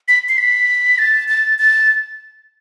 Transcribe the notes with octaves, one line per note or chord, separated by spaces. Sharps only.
B6
C7
B6
A6
A6
A6